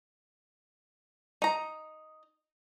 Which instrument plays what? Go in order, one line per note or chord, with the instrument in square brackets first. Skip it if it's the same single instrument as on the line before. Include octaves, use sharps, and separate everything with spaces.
[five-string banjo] D#4 A#5